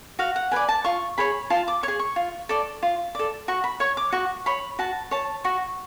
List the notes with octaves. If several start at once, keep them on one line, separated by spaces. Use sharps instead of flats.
F#4 F5
F#5
B4 D5 G#5
A5
F4 C#6
G#4 C#5 B5
F4 A5
D6
C#5 C#6
G#4
C#6
F4
A4 D5
F4
A4 D5
F#4 C#6
B5
C#5 C#6
D6
F#4 C#6
C#5 B5
F#4 A5
C#5 A5
F#4 C#6